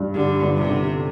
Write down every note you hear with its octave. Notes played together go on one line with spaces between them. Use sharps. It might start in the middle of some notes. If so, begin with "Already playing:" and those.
Already playing: G2
D3 G3
G1
C3
D3